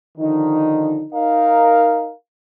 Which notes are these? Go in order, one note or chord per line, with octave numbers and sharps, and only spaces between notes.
D3 D#3 F3 D#4
D#4 A#4 F5